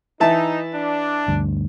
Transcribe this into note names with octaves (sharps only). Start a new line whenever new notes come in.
E3 D#4 E5 A5
D4
D2 G2